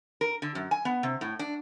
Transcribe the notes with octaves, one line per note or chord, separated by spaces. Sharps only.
A#4
D3
F#2
G#5
B3
C3
A2
D4